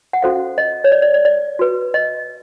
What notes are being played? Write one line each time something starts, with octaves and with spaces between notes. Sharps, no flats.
F#5
C#4 F#4 A4 C5 F5
D#5
C#5
D5
D5
D5
D5
F#4 B4
D#5